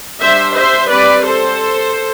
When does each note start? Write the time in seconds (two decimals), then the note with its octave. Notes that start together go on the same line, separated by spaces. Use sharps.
0.21 G3 D4 C5 E5
0.56 C5 E5
0.91 G3 C4 B4 D5
1.26 A4 C5